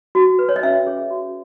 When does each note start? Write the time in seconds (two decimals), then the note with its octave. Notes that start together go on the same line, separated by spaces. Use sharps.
0.15 F#4
0.39 B4
0.49 C#5
0.56 D#5
0.63 C#4 E5
0.86 G#4 C#5
1.11 F#4